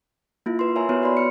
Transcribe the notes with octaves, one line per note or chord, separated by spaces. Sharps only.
A#3 E4 F4
B4 C6
A#4 C#5 E5 G#5 A#5
B3 E4 F#4 B4 C#5
F#4 B4 D5 B5 C6
F6 C#7